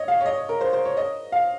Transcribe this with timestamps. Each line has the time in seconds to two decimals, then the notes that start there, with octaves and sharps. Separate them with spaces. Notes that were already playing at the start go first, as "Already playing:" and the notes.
Already playing: C#5 D#5
0.08 F5
0.21 C#5
0.26 D#5
0.38 C#5
0.49 A#4
0.61 C5
0.73 C5
0.85 C#5
0.97 D#5
1.32 F5